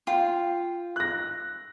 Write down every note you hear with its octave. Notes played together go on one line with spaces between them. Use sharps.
F4 G5
F#6 A#6